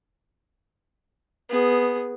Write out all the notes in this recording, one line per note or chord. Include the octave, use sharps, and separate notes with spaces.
B3 G#4